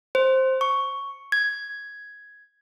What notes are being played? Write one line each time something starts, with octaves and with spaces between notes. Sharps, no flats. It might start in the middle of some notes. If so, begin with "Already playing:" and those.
C5
C#6
G#6